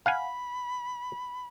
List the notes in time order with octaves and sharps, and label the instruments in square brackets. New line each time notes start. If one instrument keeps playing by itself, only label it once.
[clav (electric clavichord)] F5 F#5 G#5 [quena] B5